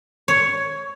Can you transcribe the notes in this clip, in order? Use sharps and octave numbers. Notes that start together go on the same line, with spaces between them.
C#5